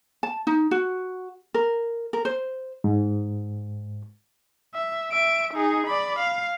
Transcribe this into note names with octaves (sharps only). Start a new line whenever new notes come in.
A5
D#4
F#4
A#4
A#4
C5
G#2
E5
E5 D7
D#4 G#4
D5 B5
F5